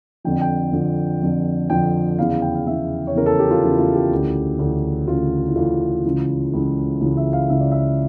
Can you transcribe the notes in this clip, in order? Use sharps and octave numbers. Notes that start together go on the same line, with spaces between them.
F2 D3 F3 G5
G5
F2 D3 F3
F2 D3 F3
F2 D3 F3 G5
E2 C#3 E3 F5
F5
G5
F5
E2 C#3 E3 E5
C#5
E2 C#3 E3 A#4
A4
G4
F4
E2 C#3 E3 E4
F4
G4
D2 C#3 E3
D2 C#3 E3
D2 C#3 E3 F4
E4
D2 C#3 E3 F4
C#2 C#3 E3
C#2 C#3 E3
C#2 C#3 E3 F4
E5
F5
C#2 C#3 E3 E5
D5
E5